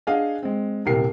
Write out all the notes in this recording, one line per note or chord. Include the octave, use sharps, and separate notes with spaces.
D4 G#4 D#5 F5 F#5 G#5
G#3 C4
D#1 C2 C3 G3 A#4 C7